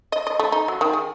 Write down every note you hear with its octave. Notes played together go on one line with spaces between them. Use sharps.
D#5
D#5
A3
D#4
F#3
D#3
G#4